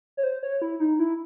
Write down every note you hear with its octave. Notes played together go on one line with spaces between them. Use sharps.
C#5
C5
C#5
E4
D#4
E4